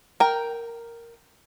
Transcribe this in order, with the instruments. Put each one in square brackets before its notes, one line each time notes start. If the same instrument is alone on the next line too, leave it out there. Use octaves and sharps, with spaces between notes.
[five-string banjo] A#4 G5